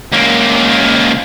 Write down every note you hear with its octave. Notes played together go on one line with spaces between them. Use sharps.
C#2 A#3